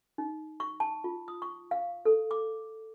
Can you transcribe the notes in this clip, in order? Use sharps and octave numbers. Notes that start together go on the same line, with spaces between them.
D#4
C#6
A5
F4
D#6
C#6
F5
A4
D6